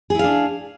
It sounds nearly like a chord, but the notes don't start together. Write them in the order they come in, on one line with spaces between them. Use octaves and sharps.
G#4 E4 F5 D4